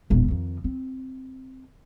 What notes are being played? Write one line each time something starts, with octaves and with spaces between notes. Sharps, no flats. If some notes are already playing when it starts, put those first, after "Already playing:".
E1 A#1
F2 D#3
C4